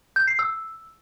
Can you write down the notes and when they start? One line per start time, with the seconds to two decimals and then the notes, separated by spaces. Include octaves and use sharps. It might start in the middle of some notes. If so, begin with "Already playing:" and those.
0.16 G6
0.28 C7
0.39 E6